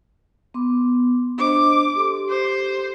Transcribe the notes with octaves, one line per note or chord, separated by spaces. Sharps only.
B3 C6 D6
D4 C5 D#5 D6
G4 A4 C6
C5